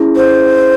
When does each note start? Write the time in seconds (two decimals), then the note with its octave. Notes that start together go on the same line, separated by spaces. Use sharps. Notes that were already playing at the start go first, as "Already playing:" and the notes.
Already playing: C#4 E4 G#4
0.16 C5